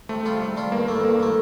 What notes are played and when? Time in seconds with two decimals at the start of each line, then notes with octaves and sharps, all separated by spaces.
0.09 C3 A3
0.25 G3 D4 F4
0.41 C3
0.57 G3 D4 F4
0.72 G2 A#3
0.88 E3 A3
1.03 G2 A#3
1.20 E3 A3